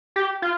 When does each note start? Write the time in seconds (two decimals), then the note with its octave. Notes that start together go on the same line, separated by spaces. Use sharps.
0.16 G4
0.42 F4